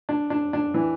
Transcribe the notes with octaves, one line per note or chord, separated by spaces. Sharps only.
D4
D4
D4
E3